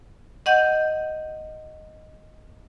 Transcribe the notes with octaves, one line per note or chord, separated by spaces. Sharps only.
D#5 F#5 G6